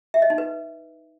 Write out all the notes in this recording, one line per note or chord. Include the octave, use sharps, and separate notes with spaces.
E5
D#5
D#4
B4